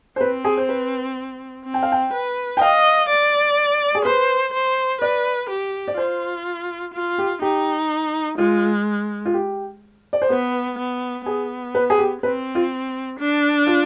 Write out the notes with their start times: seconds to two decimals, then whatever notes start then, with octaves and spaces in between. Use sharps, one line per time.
0.16 C5
0.21 C4 B4
0.45 G#4
0.57 C5
0.69 B4
1.65 C4
1.74 G5
1.83 F5
1.92 G5
2.13 B4
2.57 G5
2.61 D#5 F5
3.09 D5
3.95 G#4
4.05 B4 C5
4.53 C5
5.01 B4 D5
5.49 G4
5.88 D5
5.97 F4 C5
6.94 F4
7.18 G4
7.42 D#4 G4
8.38 G#3 F4
9.25 F4
9.34 G4
10.13 D5
10.22 C5
10.30 B3 B4
10.78 B3
11.26 B3 G#4
11.75 B4
11.90 G#4
11.98 G4
12.23 C4 B4
12.55 F4
13.19 D4
13.67 F4